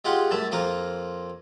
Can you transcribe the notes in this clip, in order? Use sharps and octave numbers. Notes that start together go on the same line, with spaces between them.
G#3 F4 G4 F#5
F#2 A3 A5
F2 A#3 F4 A#4